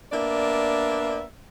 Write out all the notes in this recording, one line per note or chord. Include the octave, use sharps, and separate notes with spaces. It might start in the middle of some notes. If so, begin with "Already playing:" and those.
A#3 B3 D4 D5 E5